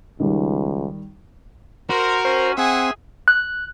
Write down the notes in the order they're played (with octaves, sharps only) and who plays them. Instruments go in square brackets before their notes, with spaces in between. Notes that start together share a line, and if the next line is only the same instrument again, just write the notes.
[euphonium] C#2 [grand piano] D#3 G3
[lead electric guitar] F#4 [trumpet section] A#4 [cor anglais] C5
[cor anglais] C#4 [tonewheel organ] C5
[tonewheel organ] C4 [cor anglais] G#4 [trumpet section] E5 F#5 G#5
[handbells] F#6